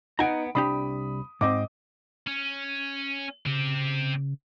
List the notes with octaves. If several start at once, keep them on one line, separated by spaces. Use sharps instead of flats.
B3 D#4 F#5 G#5 A#5 D7
C2 D4 G4 B5 D#6
G#2 C4 D#5 D6
C#4
C#3 C4 G4